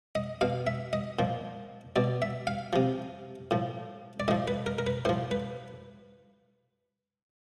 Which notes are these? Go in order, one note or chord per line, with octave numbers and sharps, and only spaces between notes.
D#5
B2 F5
E5
D#5
A#2 F3
B2 D5
E5
F5
C3 F3
A2 F3
D5
A2 F3 D#5
B4
A#4
A#4
B4
A2 F3 C5
B4